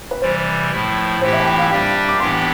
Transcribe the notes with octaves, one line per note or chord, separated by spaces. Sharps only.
B4
C3 E3 G3 C5
A2 F3 A3 E4
A2 E3 A3 E4 G4 C5
E5
A5
G5
F5
G3 D4 G4 F5
D6
A2 E3 B3 D4 G4 C6